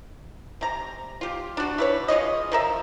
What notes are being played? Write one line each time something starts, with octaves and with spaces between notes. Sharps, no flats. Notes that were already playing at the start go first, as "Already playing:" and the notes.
C3 A#5
F4 G4
D4 F#4
E4 B4 C#5
G#3 F4 C#5 D#5
F3 A#4 E5